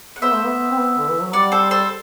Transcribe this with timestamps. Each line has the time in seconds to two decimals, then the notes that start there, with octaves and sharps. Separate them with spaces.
0.16 F#5
0.22 B3 C5 E5
0.33 A3
0.44 B3
0.71 C4
0.78 B3
0.98 D3
1.10 E3
1.22 F#3
1.33 G3 D5 F#5
1.52 A4 C5
1.71 A4 C5